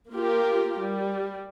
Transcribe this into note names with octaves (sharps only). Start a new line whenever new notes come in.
A#3 F4 G4 A#4
G3